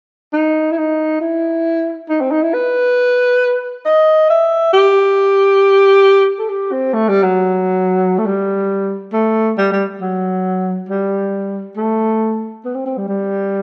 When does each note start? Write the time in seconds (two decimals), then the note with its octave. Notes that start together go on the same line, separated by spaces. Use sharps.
0.33 D#4
0.71 E4
0.78 D#4
1.21 E4
2.09 D#4
2.21 C4
2.31 D#4
2.43 E4
2.54 B4
3.85 D#5
4.30 E5
4.73 G4
6.39 A4
6.49 G4
6.72 C4
6.93 A3
7.08 G3
7.23 F#3
8.18 A3
8.26 G3
9.13 A3
9.57 G3
9.72 G3
10.01 F#3
10.89 G3
11.77 A3
12.65 B3
12.75 C4
12.86 C4
12.97 G3
13.08 G3